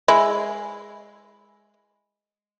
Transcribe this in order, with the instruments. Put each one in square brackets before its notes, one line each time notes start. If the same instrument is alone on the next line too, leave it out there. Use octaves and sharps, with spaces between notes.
[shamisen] G#3 E4